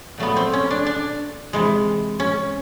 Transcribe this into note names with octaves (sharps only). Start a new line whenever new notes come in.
A#2 F#3 A3 B3
C4
C#4
D4
D4
C3 E3 G#3
C#4